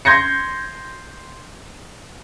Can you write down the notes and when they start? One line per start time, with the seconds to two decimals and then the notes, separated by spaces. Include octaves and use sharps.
0.05 C6 G6 G#6 A#6 C#7